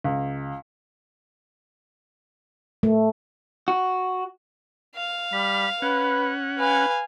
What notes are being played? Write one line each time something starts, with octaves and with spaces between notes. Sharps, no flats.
C#2
A3
F#4
F5
G3 B5
C#4 B4 F#5
B4 F5 G#5